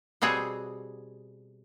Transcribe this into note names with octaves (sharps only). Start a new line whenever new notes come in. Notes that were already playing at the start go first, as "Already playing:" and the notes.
B2 G3 C4 G#4 C#5 F#5